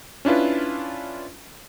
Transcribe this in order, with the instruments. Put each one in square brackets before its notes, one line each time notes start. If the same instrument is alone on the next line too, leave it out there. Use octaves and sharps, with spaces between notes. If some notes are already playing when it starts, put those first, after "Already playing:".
[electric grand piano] C#4 D4 E4 F4 B4